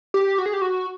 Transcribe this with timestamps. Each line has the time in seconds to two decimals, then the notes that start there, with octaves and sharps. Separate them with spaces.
0.14 G4
0.38 F#4
0.46 G#4
0.53 G4
0.62 F#4